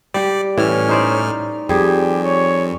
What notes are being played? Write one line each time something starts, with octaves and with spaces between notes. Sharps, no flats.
G3 G4 D5
A2 E3 C#4 F6
D#4 C5 D5
F2 G3 G4 G#4
C#5